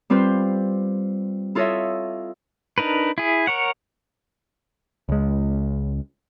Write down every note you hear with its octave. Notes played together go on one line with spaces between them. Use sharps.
G3 C4 F4 B4 C5
E4 F4 A4 C#5 D#5 E5
D4 D#4 A#4 B4
E4 G#4
A#4 C#5 F#5
C#2 G#3